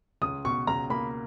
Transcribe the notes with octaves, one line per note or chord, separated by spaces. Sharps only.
C#2 D#6
B2 C#6
C#2 A#5
A#3 B5